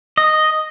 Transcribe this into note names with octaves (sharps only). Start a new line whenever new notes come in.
D#5